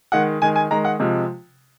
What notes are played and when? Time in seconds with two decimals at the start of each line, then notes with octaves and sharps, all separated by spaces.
0.12 D#3 G#3 F#5
0.42 D#3 G#3 G#5
0.56 G#5
0.71 D#3 G#3 A#5
0.85 F#5
1.00 C3 F3 G#3